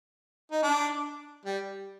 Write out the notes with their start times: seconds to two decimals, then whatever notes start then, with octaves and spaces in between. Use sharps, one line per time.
0.52 D#4
0.63 D4
1.45 G3